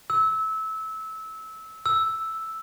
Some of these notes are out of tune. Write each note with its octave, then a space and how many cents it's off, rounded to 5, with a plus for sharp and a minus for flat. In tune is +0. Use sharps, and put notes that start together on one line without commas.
E6 -20
E6 +0